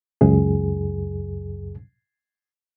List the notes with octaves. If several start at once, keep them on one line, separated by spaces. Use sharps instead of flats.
C#2 F#2 G#4